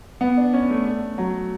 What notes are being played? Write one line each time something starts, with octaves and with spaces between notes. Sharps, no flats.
B3
D4
C#4
A3
A3
F#3